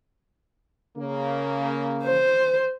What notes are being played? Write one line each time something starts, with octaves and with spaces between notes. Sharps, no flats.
C#3 A#3
C5